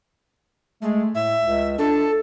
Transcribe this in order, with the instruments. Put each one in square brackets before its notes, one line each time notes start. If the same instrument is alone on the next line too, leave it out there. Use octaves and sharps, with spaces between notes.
[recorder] G#3 [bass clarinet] A3
[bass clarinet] A2 [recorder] E5
[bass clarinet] C#2
[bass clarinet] D4 [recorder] A4